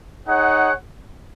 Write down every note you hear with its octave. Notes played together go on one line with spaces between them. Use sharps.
D#4 G#4 C#5 F#5